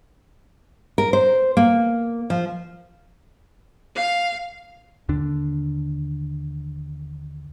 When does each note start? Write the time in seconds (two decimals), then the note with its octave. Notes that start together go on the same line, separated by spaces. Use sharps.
0.98 A#4
1.13 C5
1.57 A#3
2.30 F3
3.95 F5
5.09 D#2 D3 D4